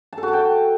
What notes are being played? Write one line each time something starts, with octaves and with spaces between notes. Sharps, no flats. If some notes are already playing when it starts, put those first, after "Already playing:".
A5
A4
F#4
A5
G5